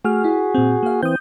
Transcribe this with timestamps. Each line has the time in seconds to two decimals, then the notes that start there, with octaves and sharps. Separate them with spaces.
0.05 A3 F#4 G#4 F6
0.24 E4
0.54 A#2 C4
0.83 A#3 F5
1.03 E3 C4 D#6 G6